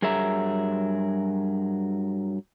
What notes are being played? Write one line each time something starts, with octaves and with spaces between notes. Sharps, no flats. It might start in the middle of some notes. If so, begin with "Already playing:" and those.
G2 F#3 G#4 A#4 E5 A#5